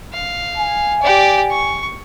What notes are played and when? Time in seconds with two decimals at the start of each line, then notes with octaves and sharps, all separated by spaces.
0.13 F5
0.57 G#5
1.02 G4 D5
1.50 C#6